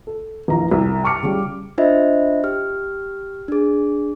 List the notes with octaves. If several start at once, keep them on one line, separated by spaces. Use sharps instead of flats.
A4
A#1 E3 F4 A#5
C2
A5 C#6 D6 F6 C#7
C#3 G3
D4 F4 C5 D#5 E5
G4 F6
D4 G#4